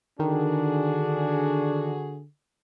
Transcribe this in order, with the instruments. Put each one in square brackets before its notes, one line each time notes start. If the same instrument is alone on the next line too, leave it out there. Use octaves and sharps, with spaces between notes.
[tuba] D3 [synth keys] D#3 [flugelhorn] D4 [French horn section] F#4 G#4